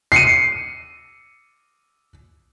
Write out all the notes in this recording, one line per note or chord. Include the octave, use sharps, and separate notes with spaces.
C7 C#7 D#7